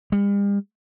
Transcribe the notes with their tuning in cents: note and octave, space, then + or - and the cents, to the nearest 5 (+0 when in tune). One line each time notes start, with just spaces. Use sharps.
G3 +45